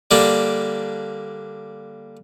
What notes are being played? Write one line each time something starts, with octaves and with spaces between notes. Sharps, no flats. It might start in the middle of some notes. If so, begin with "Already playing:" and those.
D3 G3 A#3 D4